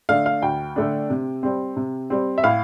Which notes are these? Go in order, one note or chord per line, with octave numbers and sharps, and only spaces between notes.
D3 A3 D4 F5
F5
D2 G5
D3 A3 D4
C3
G3 C4
C3
G3 C4
E5
A2 F5